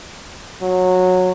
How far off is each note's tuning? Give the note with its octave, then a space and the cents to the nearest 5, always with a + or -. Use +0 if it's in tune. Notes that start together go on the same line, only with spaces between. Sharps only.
F#3 -15